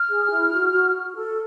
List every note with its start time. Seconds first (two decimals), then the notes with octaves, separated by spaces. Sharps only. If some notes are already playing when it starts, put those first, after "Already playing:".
Already playing: F6
0.09 G#4
0.29 E4
0.51 F#4
0.73 F#4
0.94 F#4
1.15 A4